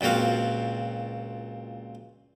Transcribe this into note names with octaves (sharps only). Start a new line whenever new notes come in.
C#2 A#2 C4 F#4 F5